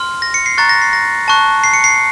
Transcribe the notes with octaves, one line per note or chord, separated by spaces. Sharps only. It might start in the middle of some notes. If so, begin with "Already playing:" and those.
Already playing: C6 F6
A#6
C#7
C7
A#5 C#6 F#6 A6
A#6
C7
A#6
A5 C#6 F#6
C7
C#7
C7